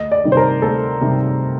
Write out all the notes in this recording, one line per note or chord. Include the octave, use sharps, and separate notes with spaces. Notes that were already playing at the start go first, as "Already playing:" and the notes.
Already playing: D2 D#5
D5
C3 D#3 G3
C5
A#4
D2 A4
C3 D#3 G3